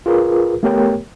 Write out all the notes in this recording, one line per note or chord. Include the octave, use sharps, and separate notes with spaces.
F4 G#4 A#4 B4
A3 B3 G4 A#4 C#5 G5